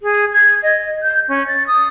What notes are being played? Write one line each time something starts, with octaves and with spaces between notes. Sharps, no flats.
G#4
G#6
D#5
G6
C#4
A6
D#6